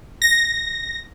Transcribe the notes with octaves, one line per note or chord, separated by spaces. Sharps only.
A#6